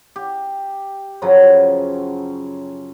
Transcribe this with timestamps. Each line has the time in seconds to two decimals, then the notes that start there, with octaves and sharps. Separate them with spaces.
0.16 G4
1.22 F#2 C#3 F3 F#3